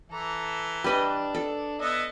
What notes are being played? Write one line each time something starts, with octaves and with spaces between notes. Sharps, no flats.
E3 A4 A#5
G3 D4 B4 D#5
A4
B3 D#5 E5